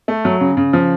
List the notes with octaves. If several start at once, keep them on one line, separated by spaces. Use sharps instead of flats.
A3
F#3
C#3
C#3
F3